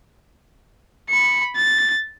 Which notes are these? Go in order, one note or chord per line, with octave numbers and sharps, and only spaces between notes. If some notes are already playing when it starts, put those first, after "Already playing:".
B5 C#7
A6